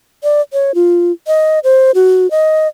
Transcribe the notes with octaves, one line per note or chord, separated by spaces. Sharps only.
D5
C#5
F4
D#5
C5
F#4
D#5